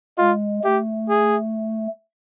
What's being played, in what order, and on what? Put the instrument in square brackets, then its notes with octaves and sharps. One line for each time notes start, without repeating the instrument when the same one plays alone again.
[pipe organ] G#3 [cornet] F4
[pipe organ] A3 [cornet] G4
[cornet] G#4